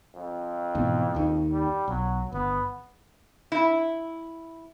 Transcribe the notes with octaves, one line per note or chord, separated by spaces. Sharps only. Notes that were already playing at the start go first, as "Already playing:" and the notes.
F2
G#2 B2 E3
D#2 D#3
G3
B1 F#3
G1 B3
E4